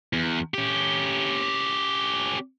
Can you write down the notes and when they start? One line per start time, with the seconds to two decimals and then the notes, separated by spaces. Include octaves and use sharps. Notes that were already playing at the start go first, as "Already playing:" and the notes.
0.13 E2
0.54 C#4 G4